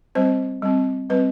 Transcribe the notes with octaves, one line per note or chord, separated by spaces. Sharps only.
G3 C4 C5
G3 C4
G3 C4 B4